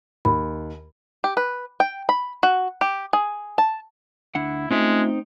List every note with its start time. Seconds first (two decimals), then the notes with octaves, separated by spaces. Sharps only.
0.25 D#2 B5
1.24 G4
1.37 B4
1.80 G5
2.09 B5
2.43 F#4
2.81 G4
3.13 G#4
3.58 A5
4.35 D2 D4 E4 F#5
4.71 G#3 A3 C4 C#4 D#4 F4 E5